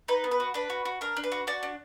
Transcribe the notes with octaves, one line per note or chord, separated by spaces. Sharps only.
D#4 B4
B3
B4
F#4
D4 B4
F#4
F#4
D4 A#4
D4
B4
F#4
F#4 D5
D4